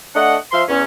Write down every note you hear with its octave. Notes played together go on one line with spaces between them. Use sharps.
A3 D4 D#5 F#5
F3 C5 E5 F5 C6
E2 C#4